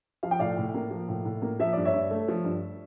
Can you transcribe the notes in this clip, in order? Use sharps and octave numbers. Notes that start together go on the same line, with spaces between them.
F3 F5
G5
A2 D5 F5
A2
A#3
F3
A2
A2
A#3
F3 E5
G2 D5
C#5 E5
G2
A3
F3
G2